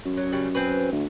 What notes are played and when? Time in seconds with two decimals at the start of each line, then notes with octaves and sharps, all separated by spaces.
0.05 F#2
0.17 F#3
0.32 C#3 G3 F#5
0.55 C4 G#4 B4
0.92 D2